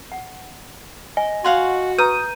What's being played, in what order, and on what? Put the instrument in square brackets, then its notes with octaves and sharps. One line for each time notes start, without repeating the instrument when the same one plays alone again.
[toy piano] F#5
[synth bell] D#5 [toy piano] G#5
[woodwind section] F#4 [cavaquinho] F5 F#5 G#5 [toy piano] C6
[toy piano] B4 A#5 [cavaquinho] D#6 [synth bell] G6 D#7